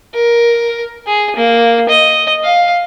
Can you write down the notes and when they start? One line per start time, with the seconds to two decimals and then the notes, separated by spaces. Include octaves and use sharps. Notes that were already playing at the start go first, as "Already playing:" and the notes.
0.14 A#4
1.07 G#4
1.36 A#3
1.89 D#5
2.44 F5